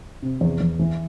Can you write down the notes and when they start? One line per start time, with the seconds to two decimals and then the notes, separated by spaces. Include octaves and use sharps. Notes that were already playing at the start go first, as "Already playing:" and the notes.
0.22 C3
0.41 E2
0.61 E2
0.79 E3